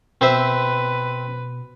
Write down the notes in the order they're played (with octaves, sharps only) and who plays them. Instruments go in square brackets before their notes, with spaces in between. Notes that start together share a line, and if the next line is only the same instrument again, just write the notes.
[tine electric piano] B2 [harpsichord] C4 C5 E5 [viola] B4